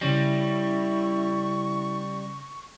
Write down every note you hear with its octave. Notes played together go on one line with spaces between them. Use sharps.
C#3 G3 C#4 E4 C#6 A#6